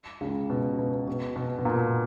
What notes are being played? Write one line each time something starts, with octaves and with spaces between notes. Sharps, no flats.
C#2 C#3
B2
B2
B2
B2
B2
A#2